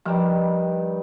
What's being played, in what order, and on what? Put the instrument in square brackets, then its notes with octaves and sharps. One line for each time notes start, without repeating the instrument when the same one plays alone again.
[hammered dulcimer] G2 D#3 G3 [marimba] F3